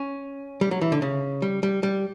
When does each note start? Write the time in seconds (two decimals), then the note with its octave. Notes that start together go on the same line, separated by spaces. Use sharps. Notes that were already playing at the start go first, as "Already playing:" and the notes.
Already playing: C#4
0.61 G3
0.71 F#3
0.81 E3
0.92 D3
1.02 C#3
1.42 G3
1.63 G3
1.83 G3